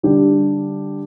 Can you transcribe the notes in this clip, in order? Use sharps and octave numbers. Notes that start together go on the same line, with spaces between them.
D3 G3 D4 G4